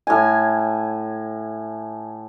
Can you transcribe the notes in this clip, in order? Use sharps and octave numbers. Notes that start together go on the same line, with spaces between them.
A2 G#5